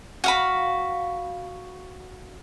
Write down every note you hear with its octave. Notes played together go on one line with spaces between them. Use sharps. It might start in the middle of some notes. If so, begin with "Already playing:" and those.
F#4 F5 B5